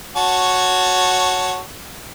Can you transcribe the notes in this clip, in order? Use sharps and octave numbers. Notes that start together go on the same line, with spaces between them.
F#4 C#5 A5